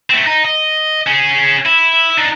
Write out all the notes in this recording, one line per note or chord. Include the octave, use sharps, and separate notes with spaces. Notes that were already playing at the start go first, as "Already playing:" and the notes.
A3 C4
D#4
D#5
C#4 G#4
E4
D4 D#4